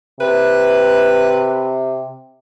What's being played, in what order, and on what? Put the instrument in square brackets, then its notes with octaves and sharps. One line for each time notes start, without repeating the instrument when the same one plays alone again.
[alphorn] C3 [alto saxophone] B4